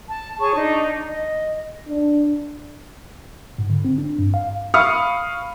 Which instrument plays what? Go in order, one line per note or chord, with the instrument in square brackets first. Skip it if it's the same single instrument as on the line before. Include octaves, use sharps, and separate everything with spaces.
[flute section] A5
G#4 C#5 A5 C#6
D4 D#4
D#5
[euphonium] D4
[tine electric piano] G#2
D3
C4
D4
G2
F5
[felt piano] F5 B5 C#6 D#6 F6 C#7